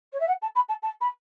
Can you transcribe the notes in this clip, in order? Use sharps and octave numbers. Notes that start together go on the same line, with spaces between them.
C#5
E5
F#5
A5
B5
A5
A5
B5